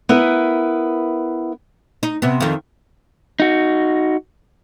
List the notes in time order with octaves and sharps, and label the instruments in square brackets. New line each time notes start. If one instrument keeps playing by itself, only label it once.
[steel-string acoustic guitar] B3 E4 A#4 B4
[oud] D#4
C3 B3
F2 D#3
[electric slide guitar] D#4 F#4